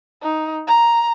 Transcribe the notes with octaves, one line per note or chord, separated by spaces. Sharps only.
D#4
A#5